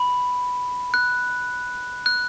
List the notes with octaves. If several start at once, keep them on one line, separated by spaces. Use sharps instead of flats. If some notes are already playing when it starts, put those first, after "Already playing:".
Already playing: B5
F#6
F#6